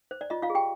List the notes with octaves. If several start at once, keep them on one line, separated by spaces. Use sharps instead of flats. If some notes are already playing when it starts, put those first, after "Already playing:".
C5
D5
F4 D#5
F4 F5
G#4
G4 G5